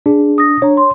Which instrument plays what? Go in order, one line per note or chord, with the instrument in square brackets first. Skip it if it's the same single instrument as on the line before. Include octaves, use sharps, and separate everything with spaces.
[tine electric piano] D4 [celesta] G#4
[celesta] D#6 A#6
[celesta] D4 A#5 [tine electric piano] C#5
[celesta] C6